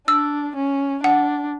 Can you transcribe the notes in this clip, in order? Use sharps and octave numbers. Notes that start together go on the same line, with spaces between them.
D4 E6
C#4
D4 F#5